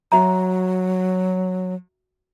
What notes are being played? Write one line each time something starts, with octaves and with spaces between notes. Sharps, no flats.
F#3 F#4 E5 A#5